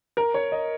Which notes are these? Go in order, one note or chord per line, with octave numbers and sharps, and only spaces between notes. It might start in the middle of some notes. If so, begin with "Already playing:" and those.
A#4
C#5
D#5